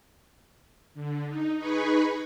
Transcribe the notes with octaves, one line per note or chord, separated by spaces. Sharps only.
D3
D#4
D#4 G#4 B4 B5 C#6